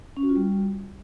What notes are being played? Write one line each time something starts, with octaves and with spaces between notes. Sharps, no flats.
C#4
F#4
F4
G3